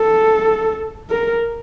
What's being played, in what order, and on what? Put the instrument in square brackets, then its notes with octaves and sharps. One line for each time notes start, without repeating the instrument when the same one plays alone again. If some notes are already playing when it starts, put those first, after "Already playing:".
Already playing: [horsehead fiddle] A4
A#4